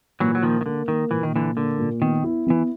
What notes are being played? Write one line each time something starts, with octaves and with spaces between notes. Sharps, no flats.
A#2 E3 F#3
F#3
D#3 F3 A#3
D#3
D3 A#3
D#3 A#3
A#2 E3
D#3
A#2 D3 E3
D3 A#3
A#2
D#3 B3
E4
E3 B3